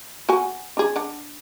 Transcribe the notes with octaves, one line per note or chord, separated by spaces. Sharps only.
F#4 F#5 G#5
D4 G#4
D4 F#5